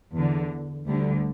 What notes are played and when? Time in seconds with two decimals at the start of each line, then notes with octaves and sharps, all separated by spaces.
0.13 E2 D3
0.87 D2 D3 G3